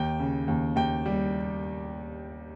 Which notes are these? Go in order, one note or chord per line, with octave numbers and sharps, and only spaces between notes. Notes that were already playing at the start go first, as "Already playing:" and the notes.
Already playing: D#2 G5
C#3
D#2
D#2 G5
G3